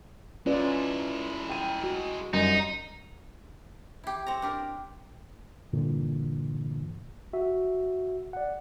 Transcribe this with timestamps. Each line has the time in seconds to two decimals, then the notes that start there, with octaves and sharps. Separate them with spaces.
0.46 G#3 C#4 E4 F4 B4 D5
1.50 G5 D#7
1.84 F#4
2.33 F#2 G3 D#4 D#5
4.04 E4 G4
4.27 C4 C#5 A#5
4.42 D4 G4 A#4
5.73 G2 A#2 D3 E3
7.33 F#4 E5
8.33 D5 F#5